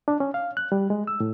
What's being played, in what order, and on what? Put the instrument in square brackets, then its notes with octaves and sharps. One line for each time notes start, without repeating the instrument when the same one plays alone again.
[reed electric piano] D4
C#4
F5
F#6
G3
G#3
E6
A2